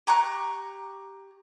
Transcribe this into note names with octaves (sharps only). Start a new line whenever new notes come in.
G4 A#5 C#6 F#6